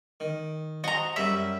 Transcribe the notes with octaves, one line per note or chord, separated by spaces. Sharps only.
D#3
F#4 C5 D#5 A#5
F#2 G3 C#4 E5